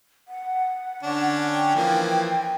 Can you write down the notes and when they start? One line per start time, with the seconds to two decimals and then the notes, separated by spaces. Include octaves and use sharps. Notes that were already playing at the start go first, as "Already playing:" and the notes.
0.28 F#5
1.03 D3 C#4 D4
1.51 G5
1.75 E3 F3 A#3